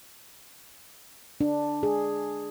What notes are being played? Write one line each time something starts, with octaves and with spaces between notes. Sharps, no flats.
D4
G#4